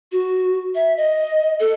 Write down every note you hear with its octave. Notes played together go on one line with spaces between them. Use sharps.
F#4
E5
D#5
A4